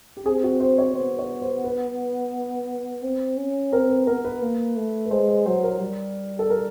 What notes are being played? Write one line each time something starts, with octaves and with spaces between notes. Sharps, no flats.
G4
C4 G#4
F#4
C5
C#5
B3 C5
C#5
C5
B4
C4
C#4
C4 A#4
B4
B3 A#4
B4
A#3
A3
B4
G#3 C5
C5
F#3 C5
A#4
G3
A4
A#4